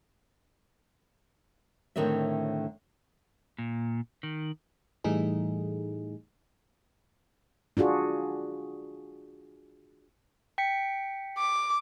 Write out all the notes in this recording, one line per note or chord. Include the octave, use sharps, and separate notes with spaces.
A2 D3 D#3 C4 C#5 E5
A#2
D#3
A2 E3 G3 A3 D#4 G#4
D4 F4 F#4 G#4
G5 B6 C#7
D6